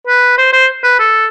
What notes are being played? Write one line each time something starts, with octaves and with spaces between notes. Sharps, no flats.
B4
C5
C5
B4
A4